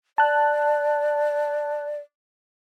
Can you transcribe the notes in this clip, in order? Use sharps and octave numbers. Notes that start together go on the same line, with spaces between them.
D5 A5 F#6